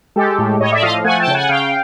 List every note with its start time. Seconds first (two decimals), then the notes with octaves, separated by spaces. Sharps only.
0.16 G#3 G4 A4
0.38 A2
0.60 A2 C#5 D#5
0.72 D5 E5
0.83 F3 D#5 F5
1.04 A3 F#5 G#5
1.20 G5 A5
1.28 C#3
1.34 F#5 G#5
1.49 C#3 F5 G5